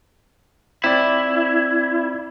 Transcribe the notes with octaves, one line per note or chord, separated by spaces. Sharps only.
C4 E4 D5